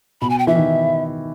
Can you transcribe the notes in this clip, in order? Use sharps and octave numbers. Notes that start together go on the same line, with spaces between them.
B2 B5
G#5
G5
E3 E5
D#3